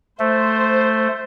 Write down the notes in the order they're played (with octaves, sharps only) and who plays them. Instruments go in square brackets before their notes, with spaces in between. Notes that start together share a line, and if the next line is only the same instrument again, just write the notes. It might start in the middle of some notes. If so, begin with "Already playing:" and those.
[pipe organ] A3 [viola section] C5